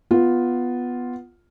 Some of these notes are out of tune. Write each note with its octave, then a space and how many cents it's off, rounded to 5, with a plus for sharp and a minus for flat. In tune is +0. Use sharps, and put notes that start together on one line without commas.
B3 +0 F4 +0